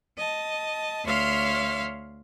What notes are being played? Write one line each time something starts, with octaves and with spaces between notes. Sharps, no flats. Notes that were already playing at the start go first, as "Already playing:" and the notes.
D#5 A5
D2 C#5 E5 F5 C6 F6